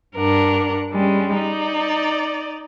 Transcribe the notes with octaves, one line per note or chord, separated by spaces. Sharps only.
G2 D4 A#4 F#5
G3 G#3 C#4
D#4 D5